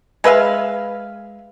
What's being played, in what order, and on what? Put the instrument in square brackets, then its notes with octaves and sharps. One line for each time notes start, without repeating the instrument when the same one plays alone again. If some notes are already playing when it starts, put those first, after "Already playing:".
[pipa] G#3 B4 E5 F5